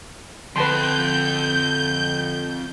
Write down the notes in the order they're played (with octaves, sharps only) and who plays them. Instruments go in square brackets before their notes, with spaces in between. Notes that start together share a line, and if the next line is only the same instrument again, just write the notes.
[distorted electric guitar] F2 [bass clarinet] D3 [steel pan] B4 A5 C6 [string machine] G6